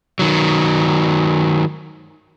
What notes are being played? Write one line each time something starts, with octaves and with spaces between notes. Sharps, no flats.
D#3 F#3